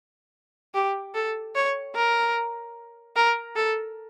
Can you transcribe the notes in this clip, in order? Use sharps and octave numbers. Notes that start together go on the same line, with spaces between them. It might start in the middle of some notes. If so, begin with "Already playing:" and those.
G4
A4
C#5
A#4
A#4
A4